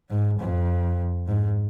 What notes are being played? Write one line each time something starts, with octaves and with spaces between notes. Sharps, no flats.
G#2
F2
G#2